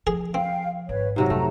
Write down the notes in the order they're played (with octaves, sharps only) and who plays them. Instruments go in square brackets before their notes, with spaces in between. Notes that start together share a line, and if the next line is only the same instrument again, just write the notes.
[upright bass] F3 [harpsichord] G#4
[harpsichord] C4 [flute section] F5 G5
[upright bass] G#1 [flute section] B4 C#5
[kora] G#2 C3 F#3 [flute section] A#5
[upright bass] F2 [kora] A3